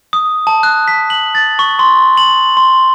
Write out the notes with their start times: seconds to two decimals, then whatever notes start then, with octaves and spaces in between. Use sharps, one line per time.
0.13 D#6
0.47 A5
0.63 F#6
0.88 B6
1.10 F#7
1.35 A6
1.59 C#6
1.79 C6
2.17 F#7
2.57 C6